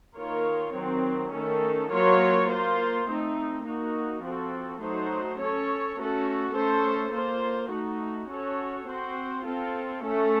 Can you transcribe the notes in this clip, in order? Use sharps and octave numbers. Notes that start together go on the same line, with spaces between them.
D#3 A#3 F4 A#4 C#5
D#3 F#3 C4
D#3 A3 C#4 A4
F#3 A#3 F4 A#4 C#5
A#3 F4 C5
A3 C4 D#4
A#3 D#4 F#4
F3 C4 F#4 A4
F#3 A3 D#4 F#4 C5
C#4 A4 C#5
A3 C#4 F#4 A4
A3 C#4 A4 C5
A#3 F4 C5
A3 D#4 F#4
C#4 F#4 A4 C#5
C4 F#4 C5
C4 F4 A4
A3 C#4 A4